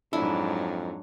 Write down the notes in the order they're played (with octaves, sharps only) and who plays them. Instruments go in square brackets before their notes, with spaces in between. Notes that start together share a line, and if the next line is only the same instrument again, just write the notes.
[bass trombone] F2 [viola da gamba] G#2 F#3 [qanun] D4 [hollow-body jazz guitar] E4